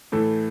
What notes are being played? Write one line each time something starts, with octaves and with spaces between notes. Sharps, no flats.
A2 E3 A3 A4